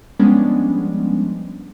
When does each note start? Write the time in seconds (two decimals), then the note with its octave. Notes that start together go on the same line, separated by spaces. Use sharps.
0.19 F3 G3 G#3 B3 C#4 D4